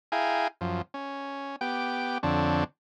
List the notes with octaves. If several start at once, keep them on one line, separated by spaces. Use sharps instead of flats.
E4 G#4 F5 G5 G#5 A#5
F#2 F3
C#4
B3 G4 G5 D6
F2 D3 C4 D4 C#5